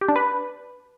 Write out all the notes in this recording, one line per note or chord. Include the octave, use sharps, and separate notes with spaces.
G4
D4
B4